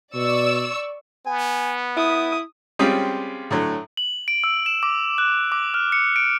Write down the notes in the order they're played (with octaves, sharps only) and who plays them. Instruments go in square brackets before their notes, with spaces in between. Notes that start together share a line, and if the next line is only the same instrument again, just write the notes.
[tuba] B2 [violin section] D5 C#6 E6
[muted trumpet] B3 [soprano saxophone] G#5
[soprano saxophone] E4 [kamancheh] D#6
[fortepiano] G3 G#3 C4 C#4 F4 G4
A2 D3 F#3
[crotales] F#7
D7
E6
E7
D6
F#6
D6
F6
C#7
D7